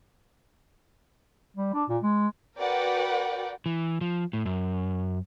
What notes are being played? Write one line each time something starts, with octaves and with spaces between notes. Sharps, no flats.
G3
D4
A#2
G#3
F#4 A#4 B4 D5 F#5 G5
E3
F3
A2
F#2